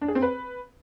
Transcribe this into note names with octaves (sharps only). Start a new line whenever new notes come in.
D4
G#4
C4
B4